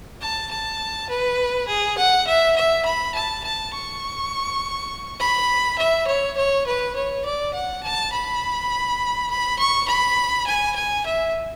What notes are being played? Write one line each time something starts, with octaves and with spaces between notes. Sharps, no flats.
A5
A5
B4
G#4
F#5
E5
E5
B5
A5
A5
C#6
B5
E5
C#5
C#5
B4
C#5
D5
F#5
A5
B5
B5
C#6
B5
G#5
G#5
E5